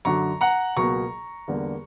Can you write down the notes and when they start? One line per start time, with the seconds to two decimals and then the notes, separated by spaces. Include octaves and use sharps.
0.05 F#2 D3 F#3 A#5 C#6
0.41 F#5 A#5
0.77 C#2 B2 F#3 A#3 A#5 C#6
1.48 E2 D3 G3 A#3